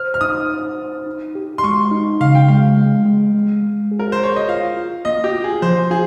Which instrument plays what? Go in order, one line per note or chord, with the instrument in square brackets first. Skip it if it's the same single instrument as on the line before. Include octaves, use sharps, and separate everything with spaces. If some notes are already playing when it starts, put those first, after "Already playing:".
Already playing: [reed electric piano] C5 [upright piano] F6
[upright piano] F6
[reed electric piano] D#4 [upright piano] D#6
[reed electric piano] C5
D#4
D#4
G4
[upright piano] C6
[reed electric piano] G#3 [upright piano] C#6
[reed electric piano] D#4
[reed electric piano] C#3 [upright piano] F5
[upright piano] G5
[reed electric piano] G#3 [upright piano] F5
[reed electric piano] G#3
G#3
G#3
G#3
G#4
[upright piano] A#4
C5
[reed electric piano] G#4 [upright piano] C#5
[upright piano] D#5
[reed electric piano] F4 [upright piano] F5
[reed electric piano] F4
[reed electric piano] A#3 [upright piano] D#5
[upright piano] G4
[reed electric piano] F4
[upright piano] G#4
[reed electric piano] F3 [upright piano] C5
[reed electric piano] F4 [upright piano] G#4